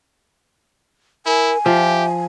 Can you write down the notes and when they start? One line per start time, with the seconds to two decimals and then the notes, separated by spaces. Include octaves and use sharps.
1.26 E4 A#4 G#5
1.66 F3 G4 E5